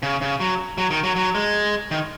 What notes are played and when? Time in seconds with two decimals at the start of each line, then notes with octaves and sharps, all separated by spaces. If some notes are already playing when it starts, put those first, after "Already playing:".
0.03 C#3
0.21 C#3
0.40 F#3
0.78 F#3
0.90 D#3
1.04 F#3
1.16 F#3
1.35 G#3
1.91 D#3